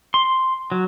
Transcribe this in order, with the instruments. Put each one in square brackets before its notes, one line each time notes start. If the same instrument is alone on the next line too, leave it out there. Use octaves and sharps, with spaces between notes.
[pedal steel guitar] C6
F#3